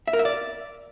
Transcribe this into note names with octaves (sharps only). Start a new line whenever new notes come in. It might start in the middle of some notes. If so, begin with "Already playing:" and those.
E5
A#4
E5
D5